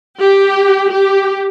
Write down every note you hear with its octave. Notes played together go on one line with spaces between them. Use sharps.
G4
G4